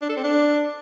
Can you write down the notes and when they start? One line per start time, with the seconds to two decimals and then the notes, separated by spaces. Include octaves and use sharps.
0.02 D4
0.09 A4
0.16 C4
0.24 D4